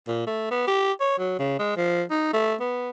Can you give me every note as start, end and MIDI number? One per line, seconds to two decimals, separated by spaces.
0.07 0.22 46
0.26 0.48 57
0.51 0.65 59
0.67 0.92 67
1.00 1.17 73
1.18 1.39 54
1.39 1.58 49
1.59 1.75 56
1.76 2.03 53
2.10 2.30 63
2.33 2.54 57
2.60 2.90 59